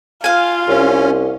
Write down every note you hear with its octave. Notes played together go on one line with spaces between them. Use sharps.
F4 F5 G#5
C2 C#4